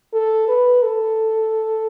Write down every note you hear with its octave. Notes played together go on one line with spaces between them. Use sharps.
A4
B4
A4